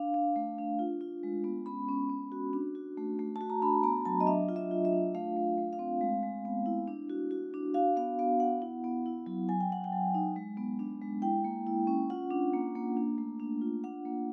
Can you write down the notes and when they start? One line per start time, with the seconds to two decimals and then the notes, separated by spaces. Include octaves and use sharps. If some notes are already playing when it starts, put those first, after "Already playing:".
Already playing: D4 F5
0.14 D4
0.36 A3
0.58 D4
0.79 F4
1.01 F4
1.23 G#3
1.44 B3
1.66 C#4 B5
1.88 C#4
2.09 C#4
2.32 F#4
2.53 D4
2.75 F#4
2.97 A3
3.19 A3
3.36 A5
3.41 F#4
3.50 A#5
3.62 D4 B5
3.83 B3 A#5
4.05 F#3 A5
4.20 D#5
4.27 D4 E5
4.49 F4
4.56 E5
4.71 F4
4.85 E5
4.93 D4
5.15 A3 F5
5.37 A3
5.58 A3
5.73 F5
5.79 C4
6.01 G#3
6.23 G#3
6.45 B3
6.66 E4
6.88 D4
7.10 F#4
7.31 F#4
7.54 D4
7.74 F#4 F5
7.97 B3 F5
8.19 B3 F5
8.40 B3 F#5
8.62 E4
8.84 B3
9.06 E4
9.27 F#3
9.49 F#3 G#5
9.61 G5
9.70 F#3 F#5
9.84 G5
9.92 F#3
10.14 D#4
10.36 G#3
10.57 B3
10.79 D4
11.02 G#3
11.22 E4 G5
11.44 A#3
11.67 E4
11.87 C#4
12.10 F4 F#5
12.31 D4
12.54 A#3
12.75 A#3
12.97 D4
13.18 A3
13.40 D4
13.61 F4
13.84 D4 F#5
14.05 A#3